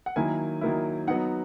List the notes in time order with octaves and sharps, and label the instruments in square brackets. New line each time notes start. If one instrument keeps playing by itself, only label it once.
[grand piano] F#5
D#3 F#3 A#3 E4 G#5
D#3 F#3 A#3 E4
F#3 B3 D#4 F#5